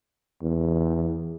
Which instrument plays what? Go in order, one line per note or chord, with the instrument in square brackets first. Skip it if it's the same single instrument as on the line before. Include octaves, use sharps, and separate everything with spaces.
[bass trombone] E2